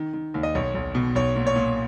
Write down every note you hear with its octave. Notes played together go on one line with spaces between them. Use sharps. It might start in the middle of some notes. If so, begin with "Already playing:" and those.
Already playing: D#3
D#3
D#2
D#5
B1 C#5
B1
B2
B1 C#5
A#2
C#5
A#2